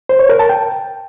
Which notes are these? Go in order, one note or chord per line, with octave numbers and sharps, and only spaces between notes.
C5
C#5
A#4
A5
G5